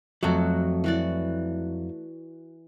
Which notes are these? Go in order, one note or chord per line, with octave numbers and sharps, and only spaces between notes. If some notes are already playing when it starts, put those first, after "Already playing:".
F2 F#3 A3 F#4 D6
E3 F#4 D5